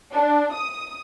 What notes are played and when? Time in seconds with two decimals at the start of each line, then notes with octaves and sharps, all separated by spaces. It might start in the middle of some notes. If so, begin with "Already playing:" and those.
0.11 D4
0.52 D#6